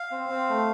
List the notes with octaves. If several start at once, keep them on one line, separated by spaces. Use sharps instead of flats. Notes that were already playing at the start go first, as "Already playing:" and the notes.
Already playing: F5
C4
C4
A3